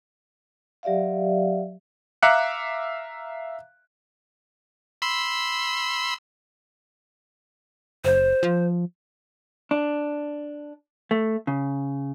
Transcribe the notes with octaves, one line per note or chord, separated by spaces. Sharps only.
F#3 G4 D5 E5 F5
E5 F5 A#5 D6 F#6 C#7
B5 C6 E6
F#1 C5
F3
D4
A3
C#3